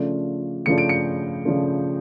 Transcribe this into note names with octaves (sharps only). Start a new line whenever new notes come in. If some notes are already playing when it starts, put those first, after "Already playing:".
Already playing: C#3 F3 A3 D4 F4
C#3 F3 A3 D4 F4 C#7
D7
C#7
C#3 F3 A3 D4 F4